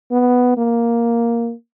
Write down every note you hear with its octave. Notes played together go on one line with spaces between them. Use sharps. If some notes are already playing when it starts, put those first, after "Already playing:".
B3
A#3